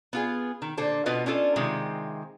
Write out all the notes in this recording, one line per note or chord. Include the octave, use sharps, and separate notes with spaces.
B3 F4 G#4
D#3
A#2 D3 A4 C5
B2 B3 F4 B4 D#5
C#4 D4 F4 A4
C3 D#3 G#3 C4 F4